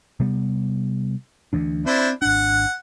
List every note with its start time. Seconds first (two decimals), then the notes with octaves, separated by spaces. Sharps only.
0.20 C3 G3 B3
1.53 D2 E3 D4
1.86 C4 D4 E4 C5
2.22 G#1 D4 F#5